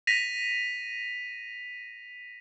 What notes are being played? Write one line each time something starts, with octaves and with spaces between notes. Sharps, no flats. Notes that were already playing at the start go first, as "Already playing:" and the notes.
A#6 B6 D#7 F7